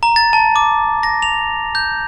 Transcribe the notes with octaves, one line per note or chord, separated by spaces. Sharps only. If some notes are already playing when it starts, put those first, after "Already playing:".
A#5
A6
A5
D6
A#6
F7
G6